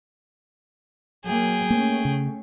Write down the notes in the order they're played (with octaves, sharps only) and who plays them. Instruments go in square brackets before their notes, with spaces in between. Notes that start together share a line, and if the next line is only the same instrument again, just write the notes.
[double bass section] F#3 A#3 [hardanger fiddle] G#4 G5
[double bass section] A3 C#4 [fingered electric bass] A#3
[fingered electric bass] C#3